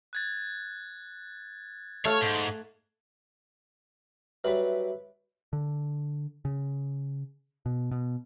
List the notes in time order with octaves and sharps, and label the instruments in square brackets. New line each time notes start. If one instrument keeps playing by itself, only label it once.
[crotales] F#6 G#6 A6
[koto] A3 F5 [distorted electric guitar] C#5
[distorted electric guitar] G#2
[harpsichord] F#3 G3 B5 [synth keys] B4 E5
[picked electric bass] D3
C#3
B2
B2